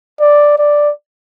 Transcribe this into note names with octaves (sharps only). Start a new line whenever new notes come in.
D5
D5